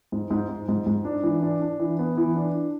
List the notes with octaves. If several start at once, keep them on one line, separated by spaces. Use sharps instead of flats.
G#2
G#2
G#2
G#2
G#2
D4
E3
D4
D4
E3
B3
E3
D4